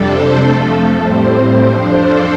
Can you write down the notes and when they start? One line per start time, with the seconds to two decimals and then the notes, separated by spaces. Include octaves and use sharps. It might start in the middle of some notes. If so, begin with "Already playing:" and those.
Already playing: F2 C3 G3 D4 A4
0.11 C5
0.42 F2 F3 A3 A4
0.73 A4
1.03 A2 G3 C4 C5
1.65 F2 F3 D4 C5
1.97 A4